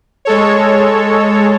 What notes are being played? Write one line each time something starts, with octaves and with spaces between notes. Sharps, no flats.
G#3 A4 C#5